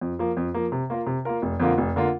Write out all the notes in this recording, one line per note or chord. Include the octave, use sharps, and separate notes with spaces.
F2
F3 A#3
F2
F3 A#3
C3
A#3 F4 A#4
C3
A#3 F4 A#4
F1
F2 D3 A#3 F4
F1
D3 A#3 F4